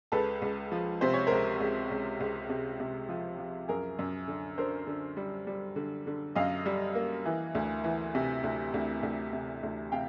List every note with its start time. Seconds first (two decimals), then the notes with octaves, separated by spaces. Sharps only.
0.12 C#2 A4 B4
0.42 C#2
0.72 F3
1.01 C3 C5
1.14 C#5
1.27 C#2 A#4 C5
1.61 C#2
1.91 C#2
2.20 C#2
2.49 C3
2.80 C3
3.09 F3
3.38 F3
3.68 F#2 G#4 A#4
3.99 F#2
4.28 D3
4.58 D3 A#4 C5
4.87 D3
5.17 G3
5.47 G3
5.76 D3
6.07 D3
6.35 F#2 D#5 F5
6.66 G3
6.95 A#3
7.26 E3
7.55 D2
7.84 E3
8.15 C3
8.44 D2
8.74 D2
9.03 D2
9.33 C3
9.63 D2
9.92 C3 F5 G5